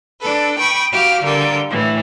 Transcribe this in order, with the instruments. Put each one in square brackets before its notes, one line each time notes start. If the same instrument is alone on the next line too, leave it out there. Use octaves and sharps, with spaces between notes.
[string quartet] D4 A4 B4
G5 B5 C#6 D#6
F#4 G4 F5
D3 G3 A#3 G5
A2 E3